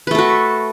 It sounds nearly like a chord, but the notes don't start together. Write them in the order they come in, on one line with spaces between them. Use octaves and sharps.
B4 A3 A4 F#4